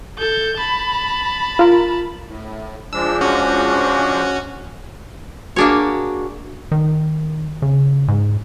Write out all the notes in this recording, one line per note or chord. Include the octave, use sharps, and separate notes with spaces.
A4 G6
A5 B5
F4 A#4
A2
F3 G#3 D4 E6
C#4 F#4
A#3 D4 F#4 G#4 C#5
D#3
C#3
G#2